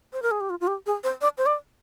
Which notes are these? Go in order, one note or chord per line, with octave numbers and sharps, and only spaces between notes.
C5
A#4
G#4
G4
F4
F4
G4
G#4
C5
D5
C5
D5